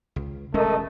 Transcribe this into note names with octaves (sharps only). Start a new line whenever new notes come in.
C#2
E1 G#3 A3 C#4 A#4 D#5